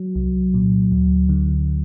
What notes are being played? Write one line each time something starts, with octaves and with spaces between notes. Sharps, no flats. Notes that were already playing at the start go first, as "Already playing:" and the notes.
Already playing: F#3
C2
A#2
D2
D3